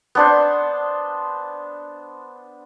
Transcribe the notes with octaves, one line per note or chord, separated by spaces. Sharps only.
B3 D4 C5